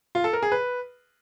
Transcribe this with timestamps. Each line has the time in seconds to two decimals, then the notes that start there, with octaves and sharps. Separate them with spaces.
0.15 F4
0.24 A4
0.33 A#4
0.42 G#4
0.52 B4